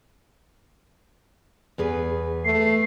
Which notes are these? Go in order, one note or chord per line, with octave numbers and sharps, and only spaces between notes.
E2 G#4 B4
A3 C7